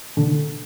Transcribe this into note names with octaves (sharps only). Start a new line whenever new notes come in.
D3